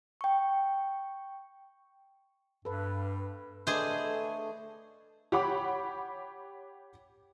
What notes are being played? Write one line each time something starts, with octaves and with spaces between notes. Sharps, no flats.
G5 C#6
G2 A4 B4
A3 D4 G#4 A4 B4 C5 D#5 D6
G4 C#5 F#5 B5 D6